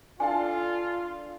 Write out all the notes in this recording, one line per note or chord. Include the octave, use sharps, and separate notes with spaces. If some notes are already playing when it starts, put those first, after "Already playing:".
D4 F4 A4 F5 G#5